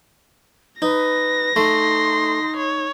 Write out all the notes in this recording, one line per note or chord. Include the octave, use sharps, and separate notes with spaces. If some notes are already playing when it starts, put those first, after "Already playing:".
D#4 B4 A#6
A3 D#4 C6
C#5